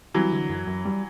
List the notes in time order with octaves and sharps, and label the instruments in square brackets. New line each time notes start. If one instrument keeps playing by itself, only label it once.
[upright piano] E3 F#3 [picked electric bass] G3
[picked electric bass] D3
F#2
F#2
G3